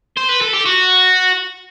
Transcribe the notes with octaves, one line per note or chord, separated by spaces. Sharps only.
C5
B4
A4
G4
F#4